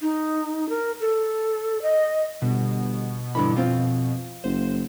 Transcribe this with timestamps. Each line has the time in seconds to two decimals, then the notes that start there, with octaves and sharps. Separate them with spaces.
0.01 D#4
0.69 A#4
1.00 A4
1.82 D#5
2.42 G1 B2
3.35 G2 D3 E3 B5
3.57 F2 C4 F4
4.44 F#1 C5